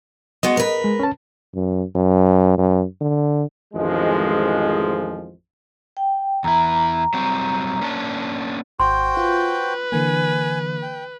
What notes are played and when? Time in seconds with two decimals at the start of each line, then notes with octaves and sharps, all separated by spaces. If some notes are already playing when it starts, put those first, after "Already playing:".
0.43 G#3 B3 F#4 D#5
0.57 A#4 B4
0.84 G#3
1.00 C#4 A5
1.55 F#2
1.95 F#2
2.58 F#2
3.01 D3
3.74 A1 F2 D#3 F3 G#3
5.97 G5
6.44 E2 E4 A#5
7.14 F#3 G3 C4
7.81 A#3 C#4 D4
8.80 G#1 F#4 C5 G5 C6
9.17 F4 B4
9.92 D3 E3 A#3 G#5
10.82 G5